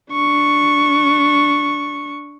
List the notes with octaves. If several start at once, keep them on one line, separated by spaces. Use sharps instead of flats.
D4 C#6